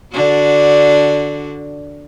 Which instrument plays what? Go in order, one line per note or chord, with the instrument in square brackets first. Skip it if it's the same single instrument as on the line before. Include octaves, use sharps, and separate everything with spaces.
[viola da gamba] D3 D4 F#4